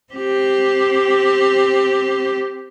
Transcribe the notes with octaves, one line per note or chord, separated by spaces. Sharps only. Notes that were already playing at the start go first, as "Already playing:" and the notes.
C4 G4